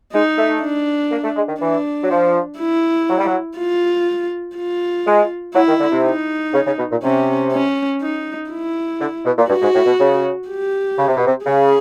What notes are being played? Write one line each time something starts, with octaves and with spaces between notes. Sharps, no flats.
G#3 D#4
A3
D4
A#3
A3
G#3
D#3
E3 D4
F#3
F3
E4
F#3
G3
F#3
F4
F4
G#3
F#3 E4
D#3
D3
C3
D#4
C#3
C#3
B2
A#2
C3 C#4
C#4
D#4
E4
D3
B2
A#2
G2 F#4
G#2
A2
B2
C#3
G4
C#3
C3
B2
C3
C#3 G#4